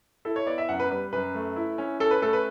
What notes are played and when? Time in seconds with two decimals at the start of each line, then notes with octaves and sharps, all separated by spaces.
0.25 E4 A4
0.36 C#5
0.46 B3 D5
0.58 E5
0.69 F#2 F#5
0.80 B4
0.91 G3 B4
1.12 F#2 B4
1.35 A3
1.56 E4
1.78 C#4
2.00 C#4 A4
2.11 B4
2.22 A3 A4
2.33 B4